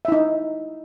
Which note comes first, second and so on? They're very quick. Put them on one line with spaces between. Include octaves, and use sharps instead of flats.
E5 E4 D#4